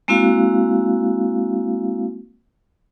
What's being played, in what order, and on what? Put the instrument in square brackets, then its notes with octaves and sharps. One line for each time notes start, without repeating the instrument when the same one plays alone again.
[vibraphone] G#3 A#3 C4 E4 F#4 F5